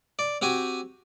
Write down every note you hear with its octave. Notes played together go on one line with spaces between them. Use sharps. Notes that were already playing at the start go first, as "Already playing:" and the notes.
D5
C4 F#4 G4 G#5